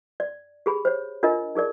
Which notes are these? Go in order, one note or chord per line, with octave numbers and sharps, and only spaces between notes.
D5
G4 G#4 B5
C5 C#5
D4 F4 A#4 D#5
D#4 G#4 A#4 D5